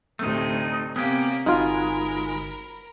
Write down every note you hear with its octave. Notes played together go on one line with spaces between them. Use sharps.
D2 A2 C3 A3 D#4
C3 A#3 B3 C#4 G4 D6
G1 G#3 D#4 F4 F#4 A#4 B5